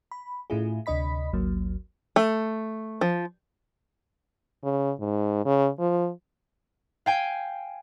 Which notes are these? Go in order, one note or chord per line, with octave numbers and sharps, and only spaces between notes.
B5
A2 A3 C#4 E4 F4 G#4
D2 C3 D4 D#5 B5 B6
G#1 D2 F#3 A#3
A3
F3
C#3
G#2
C#3
F3
F5 G5 G#5